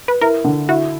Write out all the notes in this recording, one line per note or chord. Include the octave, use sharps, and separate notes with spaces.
B4
E4 A#4
D3
E4 F#4